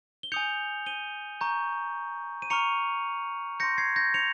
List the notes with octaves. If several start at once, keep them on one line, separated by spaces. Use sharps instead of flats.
G7
G#5 D#6 G6 C#7 F7
D#7 G7
A#5 C#6 G6
D#7
A#5 C#6 F6 C#7 F7
C6 G6 A#6 C#7
G#6 C7
G6 A#6
C#7 F7